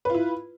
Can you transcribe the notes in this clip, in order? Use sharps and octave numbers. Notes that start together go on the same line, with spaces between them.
E4 F4 B4